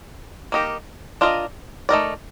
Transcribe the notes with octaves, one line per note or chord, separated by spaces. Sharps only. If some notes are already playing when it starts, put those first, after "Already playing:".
A#3 D#4 G4 A#4
D4 F4 A#4 D#5
A3 D#4 A#4 D5